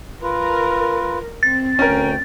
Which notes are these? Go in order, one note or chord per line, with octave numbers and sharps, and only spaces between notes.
F4 A#4 B4
C4 A6
D2 C#4 A#4 G5